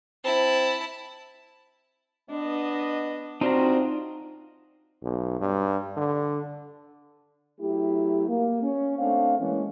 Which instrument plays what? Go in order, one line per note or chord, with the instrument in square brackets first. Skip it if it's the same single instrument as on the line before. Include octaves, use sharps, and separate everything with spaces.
[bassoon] C4 [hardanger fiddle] E4 A5
[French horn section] B3 D#5 [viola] D4
[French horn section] C3 F#4 [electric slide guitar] C4 D4 [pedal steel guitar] D#4 F4 A#5
[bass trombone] B1
G2
D3
[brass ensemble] F#3 A3 E4 G4
A#3
C#4
A3 C4 D4 F5
E3 G#3 A#3 C#4